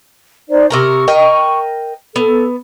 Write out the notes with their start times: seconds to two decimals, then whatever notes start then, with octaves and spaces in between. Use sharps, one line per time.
0.50 D#4 C5 D5
0.70 C3 A#4 A#5 C#6
1.08 A#4 D#5 G5
2.16 B3 A4